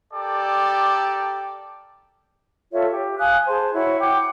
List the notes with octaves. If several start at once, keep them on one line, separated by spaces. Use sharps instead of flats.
G4 A4 A#4 D5
F4 A4 C#5 E5
G4
F5 G#5 D#6 F#6
G#4 C5 A5
E4 F#4 C#5
F#5 G5 D6